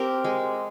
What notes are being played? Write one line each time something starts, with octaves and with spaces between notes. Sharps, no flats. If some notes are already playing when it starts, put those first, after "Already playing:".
Already playing: C4 G4 A#4
G#3